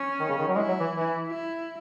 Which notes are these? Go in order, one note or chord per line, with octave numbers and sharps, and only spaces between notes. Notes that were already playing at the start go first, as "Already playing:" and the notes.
Already playing: C#4
D#3
C#3
D#3
F#3
G#3 E4
F#3
E3
E3
E4